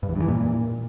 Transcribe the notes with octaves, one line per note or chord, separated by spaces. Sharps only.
G2
E2
G2
E3
A#2